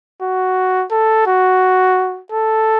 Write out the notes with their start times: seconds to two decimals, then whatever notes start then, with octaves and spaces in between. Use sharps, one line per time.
0.22 F#4
0.91 A4
1.27 F#4
2.32 A4